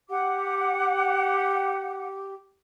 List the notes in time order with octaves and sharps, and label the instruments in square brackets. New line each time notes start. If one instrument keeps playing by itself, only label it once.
[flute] G4 [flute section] F#5 D6